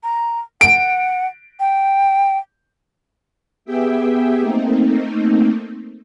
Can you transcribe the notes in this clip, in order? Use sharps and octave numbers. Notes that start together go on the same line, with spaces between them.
A#5
F#5 D7
G5
B3 G4 G#4 E5 G5
A3 A#3 C4 D#4